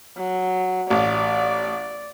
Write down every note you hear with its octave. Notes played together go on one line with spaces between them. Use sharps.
F#3
A1 D5